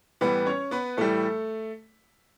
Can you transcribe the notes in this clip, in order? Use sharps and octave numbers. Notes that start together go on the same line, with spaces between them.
A2 E3 G3 B3 B4
C#4 C#5
B3 B4
A2 E3 G3 A3 A4